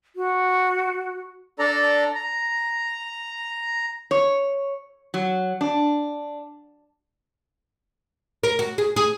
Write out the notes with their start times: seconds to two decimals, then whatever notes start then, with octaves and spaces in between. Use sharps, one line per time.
0.16 F#4
1.59 D4 A4 D5 A#5
2.15 A#5
4.11 C#5
5.14 F#3
5.61 D4
8.43 A#4
8.59 F#4
8.78 G#4
8.96 G#4